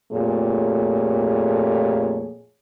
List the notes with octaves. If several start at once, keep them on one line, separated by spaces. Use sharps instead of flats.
F2 A#2 A3 G4 G#4 C#5